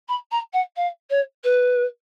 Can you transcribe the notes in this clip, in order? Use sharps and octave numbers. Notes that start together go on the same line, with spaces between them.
B5
A#5
F#5
F5
C#5
B4